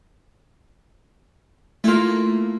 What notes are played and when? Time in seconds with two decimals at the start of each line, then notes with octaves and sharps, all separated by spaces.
1.84 A3 A#3 E4 F4